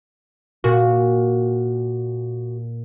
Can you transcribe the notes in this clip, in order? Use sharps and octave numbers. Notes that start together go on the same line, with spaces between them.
A#2 F#4